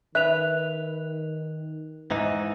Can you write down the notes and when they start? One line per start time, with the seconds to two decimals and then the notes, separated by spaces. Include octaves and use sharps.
0.15 D#3 B4 E5 F#6 F7
2.11 G#2 E3 D#4